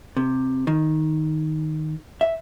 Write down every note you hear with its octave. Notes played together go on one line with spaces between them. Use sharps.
C3
D#3
E5